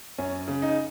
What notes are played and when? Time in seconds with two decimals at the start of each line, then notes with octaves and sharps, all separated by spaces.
0.18 F#2 C#4
0.48 C#3
0.62 D#4